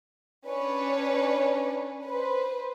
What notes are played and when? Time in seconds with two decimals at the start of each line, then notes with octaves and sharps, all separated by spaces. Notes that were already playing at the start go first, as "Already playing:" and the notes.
0.47 C#4 D4 B4 C#5
2.05 B4 C5